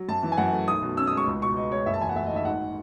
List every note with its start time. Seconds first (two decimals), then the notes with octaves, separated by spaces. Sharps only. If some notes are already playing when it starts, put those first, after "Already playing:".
Already playing: F#3
0.09 F#2 A5
0.23 E3
0.32 G#5
0.37 F#2 F#5
0.52 A3
0.68 B1 D#6
0.82 B2
0.97 C#4 E6
1.07 D#6
1.12 G#3 C#6
1.27 C#2
1.42 B2 C#6
1.57 B3 D#5
1.71 G#3 C#5
1.86 F#1 E5
1.94 A5
2.01 E2 G#5
2.09 F#5
2.15 A3 E5
2.26 D#5
2.31 D#3
2.36 E5
2.45 G#1 F#5